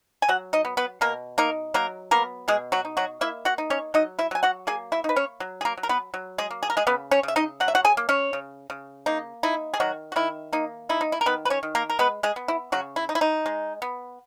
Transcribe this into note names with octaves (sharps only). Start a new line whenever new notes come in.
G#5
F#3 F#4 F#5
D#4 D#5
B3
B3 B4
B2 A#3 A#4
A#3 D#4 A#4
F#3 A#3 A#4
A#3 B3 A#4
B2 G#3 G#4
F#3 F#4
D#4
F#3 F#4
A#3 E4 E5
F#4 F#5
D#4
C#4 C#5
F#3 D#4 D#5
E4 E5
F#3 G#5
F#4 F#5
A#3 G#4 G#5
E4 E5
D#4 B4
C#4 C#5
F#3
G#4
A#3 A#4
F#3
A#4
B3 B4
F#3
G#3 G#4
A#3
G#4
A#4
G#3 G#4
C#3 B3 B4
C#4 C#5
C#3 E5
D#4 D#5
F#3 F#5
E5
F#4 F#5
G#4 G#5
A#3
C#4 C#5
C#3
C#3
A#3 D#4
D#4 E4
G#4
D#3 F#3 F#4
F#4
D#3 E4
A#3 D#4
D#4 E4
D#4
E4
A#4
D#3 B3 B4
B4
C#4 C#5
D#3
A#3 A#4
A#4
G#3 B3 B4
G#3 G#4
B3
E4
C#3 F#3 F#4
E4
D#4
E4
D#4
G#3
B3